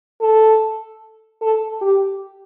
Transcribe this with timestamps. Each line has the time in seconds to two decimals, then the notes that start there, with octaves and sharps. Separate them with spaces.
0.21 A4
1.42 A4
1.81 G4